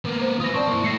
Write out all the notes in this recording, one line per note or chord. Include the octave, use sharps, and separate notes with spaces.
A#3 B3
C5
F4 B4 D#6 A#6
C4 C5 D5 A5 C#6
A#3 E4
A3 E4 A#6 C7 C#7